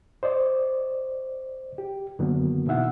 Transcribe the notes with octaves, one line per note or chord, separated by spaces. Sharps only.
C5 D5 D#5
G4
F#2 D3 D#3 F#3 A#3 B3
B2 E3 D#4 E5 F#5